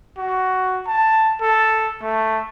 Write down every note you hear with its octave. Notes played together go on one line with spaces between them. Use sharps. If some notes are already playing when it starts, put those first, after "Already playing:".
F#4
A5
A4
A3